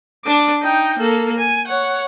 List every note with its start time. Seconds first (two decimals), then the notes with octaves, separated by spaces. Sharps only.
0.25 D4 D6
0.63 D#4 G5
0.99 A#3 A4
1.38 G#5
1.67 C#5 F#5